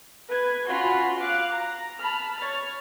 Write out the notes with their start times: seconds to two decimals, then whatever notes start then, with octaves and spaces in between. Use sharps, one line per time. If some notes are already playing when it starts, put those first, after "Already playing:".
0.29 B4 G#6
0.68 C#4 F4 F#4 B5 C6
1.19 F5 D6 F#6
1.52 A#5
1.98 A5 B5 F6
2.37 C#5 F6 A6